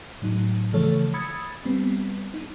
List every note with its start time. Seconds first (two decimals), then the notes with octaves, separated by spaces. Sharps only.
0.22 A2 F#3 D#4
0.73 C#3 E3 F3 A3 A4 C#5
1.14 B5 D#6 E6 G#6 A6 C#7
1.65 G3 B3 C4
2.34 D#4